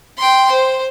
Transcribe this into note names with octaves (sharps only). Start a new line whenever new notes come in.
G5 C6
C5